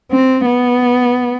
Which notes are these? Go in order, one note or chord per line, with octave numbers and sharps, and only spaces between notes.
C4
B3